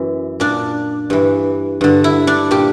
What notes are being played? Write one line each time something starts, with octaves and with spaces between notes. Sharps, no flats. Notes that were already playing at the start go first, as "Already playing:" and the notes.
Already playing: F#2 E3 E4
A#2 D4
G2 E3
G2 D3
E4
D4
A#2 G4